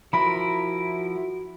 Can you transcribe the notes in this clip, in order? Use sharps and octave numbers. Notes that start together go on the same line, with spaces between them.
F3 E4 F#4 A#4 B5